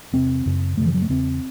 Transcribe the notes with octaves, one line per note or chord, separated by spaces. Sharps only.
E2 C3 C4
F#2 C#3
F#2 C#3 A3
E3
F#3
A3
E2 C#3 C4